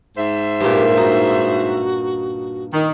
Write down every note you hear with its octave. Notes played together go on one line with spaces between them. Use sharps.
G#2 C5 E5
G2 A#2 G4
D#4 F#4
D#3